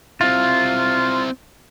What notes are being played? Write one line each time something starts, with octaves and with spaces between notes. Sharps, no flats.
C4 E4 F4